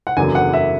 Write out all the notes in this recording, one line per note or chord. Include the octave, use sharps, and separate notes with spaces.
F#5
F#1 E2 D3 F#3 G#5
F#5
E5